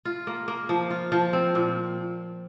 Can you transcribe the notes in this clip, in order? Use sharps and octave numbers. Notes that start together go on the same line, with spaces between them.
F4
A#3
A#3
F3
F4
F3
C4
A#2